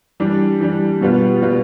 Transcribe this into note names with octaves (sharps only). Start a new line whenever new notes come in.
E3 G3 D4
E3 G3 D4
B2 G3 B3 F4
B2 G3 B3 F4